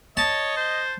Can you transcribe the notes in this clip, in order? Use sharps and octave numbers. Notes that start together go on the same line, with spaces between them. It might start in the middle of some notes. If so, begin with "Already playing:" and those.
C#5 D#5 A5
C5